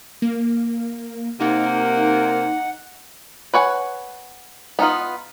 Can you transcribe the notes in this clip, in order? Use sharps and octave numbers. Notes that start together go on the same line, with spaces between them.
A#3
C3 A#3 D#4 F#5
B4 C#5 F#5 G#5
B3 D#4 F4 B4